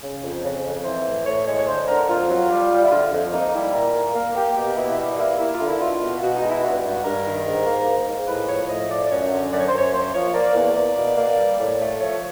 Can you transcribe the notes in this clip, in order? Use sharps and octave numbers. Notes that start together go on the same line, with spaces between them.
C#3
F2
C#3
F2
E3 C5
A2
A2 C#5
G#3 C#5
C#5
D3 C5
D3 A#4
F2 F4
F#3
G3
G3
E4
D3 F4
F2
A#3 D#4
G3 E4
A#2 A#4
A#3
A#3
A#3 G4
B2 G4
B2 E4
G3 E4
A#3 E4
A#3 E4
F4
D3
E4
B2 F4
B2
B2 F#4
D#4
G#3
E4
G2 F#4
G2
G2 A#4
D#3
G#2
A#3
A#3
G#2
A2 B4
F3 C#5
A2 D#5
F3 D5
F#2 C#5
D3
F#2 D5
C#5
C5
F#2 C#5
A#3 C5
F3 C#5
A#3 D5
E2
A#3
B2
A#3
G3
A2
A3
F3 C#5